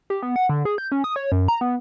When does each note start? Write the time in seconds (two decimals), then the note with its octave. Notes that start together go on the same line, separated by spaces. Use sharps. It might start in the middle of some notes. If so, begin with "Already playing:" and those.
0.10 G4
0.23 B3
0.36 F#5
0.49 D3
0.65 G#4
0.78 G6
0.92 C#4
1.04 D#6
1.16 C#5
1.32 F#2
1.48 A#5
1.61 B3